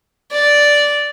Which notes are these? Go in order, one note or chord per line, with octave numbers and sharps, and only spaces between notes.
D5